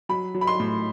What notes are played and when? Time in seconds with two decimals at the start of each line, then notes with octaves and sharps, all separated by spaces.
0.09 F#3 B5
0.35 F#3
0.41 B5
0.47 C6
0.60 A2